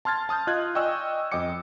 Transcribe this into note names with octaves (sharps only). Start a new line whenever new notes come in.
A5 C6 F6 G#6 A6
A5 D#6 F6 G6
F4 D#5 F#6 G#6
D5 D#5 G5 G#5 C#6 E6
F2 D#5 G5 D6 C#7